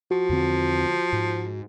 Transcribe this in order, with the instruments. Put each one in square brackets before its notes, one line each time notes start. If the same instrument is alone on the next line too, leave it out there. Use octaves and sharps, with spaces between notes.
[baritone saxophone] F3 [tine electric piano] F#4
[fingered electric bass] E2 D3 C4
G#2